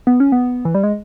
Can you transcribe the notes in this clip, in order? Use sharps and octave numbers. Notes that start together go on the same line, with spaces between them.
B3
C#4
B3
E3
G3
G#3